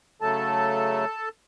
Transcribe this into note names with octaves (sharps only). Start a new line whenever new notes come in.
C#3 F#3 A3 A4 A5